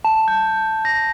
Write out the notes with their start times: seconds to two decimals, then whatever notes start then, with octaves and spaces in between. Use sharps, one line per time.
0.05 A5
0.28 G6
0.85 A#6